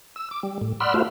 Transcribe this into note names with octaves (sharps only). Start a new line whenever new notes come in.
E6
D6
G3
A2
D5 F#5 B5 C6 E6 F6
A3 F4 F#4 C5 E5 F5